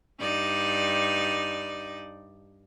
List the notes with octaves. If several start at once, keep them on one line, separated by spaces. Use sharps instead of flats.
G2 D#4 D5